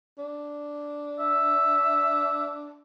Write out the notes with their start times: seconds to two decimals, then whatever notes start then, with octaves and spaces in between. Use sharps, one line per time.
0.18 D4
1.19 E5